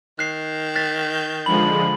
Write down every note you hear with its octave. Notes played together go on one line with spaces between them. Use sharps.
D#3 F#6 C7
F#6 A6 B6
G6
D3 F3 G#3 B5 F#7